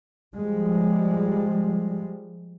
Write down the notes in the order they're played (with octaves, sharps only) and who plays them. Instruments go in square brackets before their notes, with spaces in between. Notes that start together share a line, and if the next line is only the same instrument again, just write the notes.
[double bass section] F3 G3 G#3